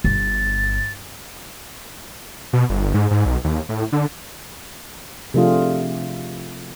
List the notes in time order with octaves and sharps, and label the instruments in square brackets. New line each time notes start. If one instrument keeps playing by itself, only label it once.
[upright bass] G1 [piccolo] A6
[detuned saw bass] B2
G1
G#2
G#2
B1
D#2
A2
D3
[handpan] C3 F3 A3 D4 F4 G#4